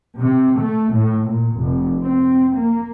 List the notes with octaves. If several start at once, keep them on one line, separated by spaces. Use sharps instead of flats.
C3
A3
A2
A#2
F1
C4
A#3